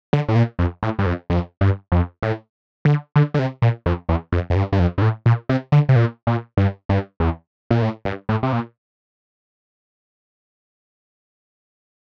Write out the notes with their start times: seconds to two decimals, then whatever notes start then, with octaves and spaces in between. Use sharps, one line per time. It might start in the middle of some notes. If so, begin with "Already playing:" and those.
0.13 D3
0.29 A2
0.36 A#2
0.59 F2
0.83 A2
0.99 G2
1.06 F2
1.30 F2
1.61 G2
1.92 F2
2.23 A2
2.85 D3
3.16 D3
3.34 D3
3.39 C3
3.62 A#2
3.86 F2
4.09 E2
4.32 F2
4.50 F2
4.56 G2
4.72 G2
4.79 F2
4.98 G2
5.02 A2
5.26 A#2
5.49 C3
5.72 D3
5.89 C3
5.96 A#2
6.27 A#2
6.57 G2
6.89 G2
7.20 E2
7.71 A#2
7.82 A2
8.05 G2
8.29 A2
8.43 C3
8.53 A#2